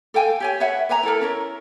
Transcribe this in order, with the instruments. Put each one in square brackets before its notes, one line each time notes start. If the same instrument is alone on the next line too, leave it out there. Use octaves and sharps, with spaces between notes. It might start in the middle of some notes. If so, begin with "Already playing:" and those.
[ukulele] A4 F5 G5 G#5
G4 C#5 G#5
B4 C#5 E5 F#5
B4 E5 G#5 A#5
E4 A4 A#4
C#4 E4 A#4